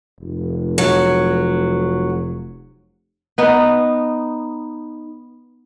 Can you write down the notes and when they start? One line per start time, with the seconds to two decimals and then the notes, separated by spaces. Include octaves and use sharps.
0.20 F1
0.78 F#3
3.38 B3 D#4